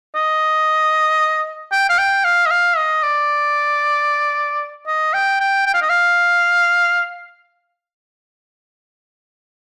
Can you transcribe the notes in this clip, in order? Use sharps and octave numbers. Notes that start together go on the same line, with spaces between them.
D#5
G5
F5
G5
F5
D#5
F5
D#5
D5
D#5
G5
G5
G5
F5
D#5
F5